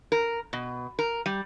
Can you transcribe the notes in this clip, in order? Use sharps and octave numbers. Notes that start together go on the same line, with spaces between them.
A#4
B2
A#4
G3